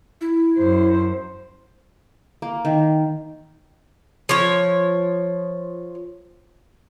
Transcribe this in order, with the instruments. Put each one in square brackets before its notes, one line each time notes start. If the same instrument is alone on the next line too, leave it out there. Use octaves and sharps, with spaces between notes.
[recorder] E4
[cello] F#2 C5
[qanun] A#3
D#3
[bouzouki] F3 C#5